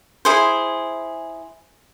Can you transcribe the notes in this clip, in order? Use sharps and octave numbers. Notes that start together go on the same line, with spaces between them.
E4 G#4 C5